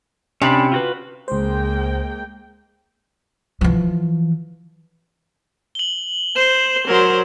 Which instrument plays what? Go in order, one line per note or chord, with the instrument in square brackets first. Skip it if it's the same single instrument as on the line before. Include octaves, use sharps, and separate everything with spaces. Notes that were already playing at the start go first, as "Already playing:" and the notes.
[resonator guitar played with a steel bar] C3 [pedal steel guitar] C#4 D4 B5
[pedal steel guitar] F4 F#4 B4
[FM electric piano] C#2 C5 [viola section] G#3 A#3 G5
[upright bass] E3 F3
[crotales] F#7 G7
[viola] C5 [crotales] E7
[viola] F#3 [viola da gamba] A#4 C5